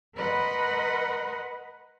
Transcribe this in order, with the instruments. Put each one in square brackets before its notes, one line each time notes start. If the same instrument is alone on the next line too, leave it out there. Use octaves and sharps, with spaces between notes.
[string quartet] A#4 B4 D#5 F#5 B5 C6